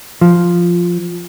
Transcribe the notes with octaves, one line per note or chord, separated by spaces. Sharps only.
F3